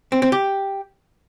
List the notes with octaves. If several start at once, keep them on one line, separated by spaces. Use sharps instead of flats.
C4
C4
G4